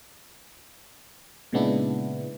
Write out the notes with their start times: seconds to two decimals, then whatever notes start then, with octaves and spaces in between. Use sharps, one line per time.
1.53 A#2 C#3 G#3 B3 D4 E4